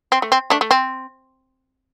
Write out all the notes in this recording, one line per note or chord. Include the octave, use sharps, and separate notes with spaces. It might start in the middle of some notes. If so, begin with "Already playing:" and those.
C4
A3
C4
A3 D4
A3
C4